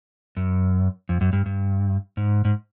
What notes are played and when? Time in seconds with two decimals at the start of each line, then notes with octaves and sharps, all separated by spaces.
0.37 F#2
1.09 F2
1.21 F#2
1.33 G2
1.46 G2
2.17 G#2
2.45 G#2